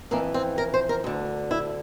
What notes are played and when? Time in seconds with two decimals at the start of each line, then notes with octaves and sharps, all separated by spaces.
0.11 F2 E3 A#3
0.34 C4
0.58 A#4
0.74 C5
0.89 A#4
1.04 D2 D3
1.51 E4